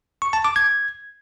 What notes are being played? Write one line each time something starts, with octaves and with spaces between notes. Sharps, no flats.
C#6
A5
D6
G#6